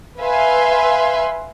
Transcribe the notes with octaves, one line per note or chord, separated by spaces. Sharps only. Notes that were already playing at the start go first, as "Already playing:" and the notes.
B4 E5 F5 G#5 C6